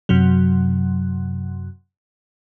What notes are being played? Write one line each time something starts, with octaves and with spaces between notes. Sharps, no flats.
F#2 C3 F#3